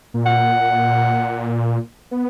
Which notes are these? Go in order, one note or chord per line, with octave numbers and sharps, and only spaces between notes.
A#2
F#5
B3